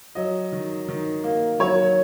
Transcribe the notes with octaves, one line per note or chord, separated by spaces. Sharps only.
F#3 D#5
D#3
D#3
A#3
F#3 C#5